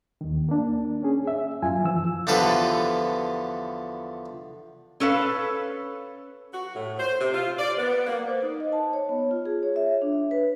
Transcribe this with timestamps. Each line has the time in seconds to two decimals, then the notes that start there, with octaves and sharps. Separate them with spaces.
0.21 D#2 D#3
0.49 A#3 D4
1.03 C#4 G#4
1.27 E5
1.62 F#2 F4 G#5
1.84 E3 F3 E6
2.27 E2 D3 F3 G4 A4 B4
5.00 C#4 A4 B4 F5
6.54 F#4
6.75 A2
6.99 C5
7.21 C3
7.34 F4
7.59 D5
7.78 B3
8.07 A#3
8.27 C5
8.43 D#4
8.60 D#5
8.72 A5
8.93 C#5
9.09 B3
9.31 F4
9.46 G#4
9.63 C#5
9.76 E5
10.02 D4
10.31 B4